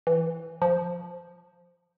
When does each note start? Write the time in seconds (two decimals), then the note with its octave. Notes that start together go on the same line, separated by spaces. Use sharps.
0.07 E3
0.62 F3